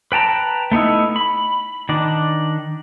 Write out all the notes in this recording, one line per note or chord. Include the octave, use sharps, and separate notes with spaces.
B4 G5 A5 A#5
A3 B3 D#4 E4
B5
D#3 D4